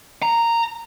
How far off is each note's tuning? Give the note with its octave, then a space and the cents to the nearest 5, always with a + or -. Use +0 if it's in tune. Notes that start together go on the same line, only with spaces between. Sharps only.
A#5 -10